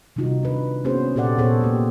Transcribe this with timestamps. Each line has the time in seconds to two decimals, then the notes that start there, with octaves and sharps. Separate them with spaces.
0.16 C3 D#3 G3 D#4 F4 F#4
0.43 D4 B4
0.84 A#3 B3 C#4 F#4 G#4 C5
1.16 A#2 G4 A4 D5 F#5
1.38 A#2 B3 G#4 A4 C5 C#5
1.61 A#3 G4